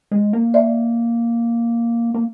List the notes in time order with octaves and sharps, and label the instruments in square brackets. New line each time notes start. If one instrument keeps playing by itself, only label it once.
[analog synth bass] G#3
A#3
[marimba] D5 E5
[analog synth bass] A#3